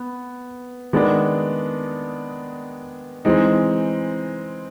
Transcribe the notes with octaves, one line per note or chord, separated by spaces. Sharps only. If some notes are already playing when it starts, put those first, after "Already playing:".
Already playing: B3
D#3 G#3 B3 D4
E3 G#3 C4 D#4